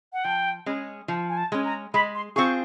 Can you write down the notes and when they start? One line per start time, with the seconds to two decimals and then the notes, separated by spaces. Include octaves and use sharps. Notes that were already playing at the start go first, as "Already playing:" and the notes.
0.13 F#5
0.24 F3 G5
0.66 G#3 C#4
1.08 F3
1.29 G#5
1.37 A5
1.52 G#3 C#4
1.65 A#5
1.94 G#3 B5
2.15 C6
2.36 C4 F4 G#4 C#6